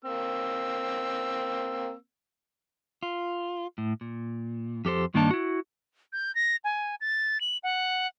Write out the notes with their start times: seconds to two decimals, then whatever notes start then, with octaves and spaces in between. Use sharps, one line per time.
0.05 A#3 C4 E6
3.03 F4
3.78 A2
4.01 A#2
4.85 F2 G4 A4 C5
5.14 G2 D#3 A#3 D4 D#4 A5
5.31 E4 F#4
6.13 G6
6.35 A#6
6.64 G#5
7.01 A6
7.41 F#7
7.63 F#5